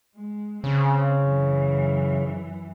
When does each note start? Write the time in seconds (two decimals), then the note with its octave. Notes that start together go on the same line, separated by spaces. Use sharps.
0.16 G#3
0.64 C#3 C4
1.22 F#2 E3